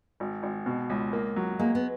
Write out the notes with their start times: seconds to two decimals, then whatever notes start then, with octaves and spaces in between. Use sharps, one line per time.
0.20 G#1
0.43 G#1
0.66 B2
0.90 C#2
1.13 A#3
1.36 F#3
1.59 G#3 A#3
1.75 B3